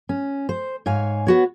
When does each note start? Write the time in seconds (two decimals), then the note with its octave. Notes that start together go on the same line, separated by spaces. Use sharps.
0.09 C#4
0.49 C5
0.86 G#2 C#5 F5 G#5
1.27 B3 F#4 C#5